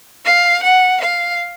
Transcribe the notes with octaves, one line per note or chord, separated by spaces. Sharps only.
F5
F#5
F5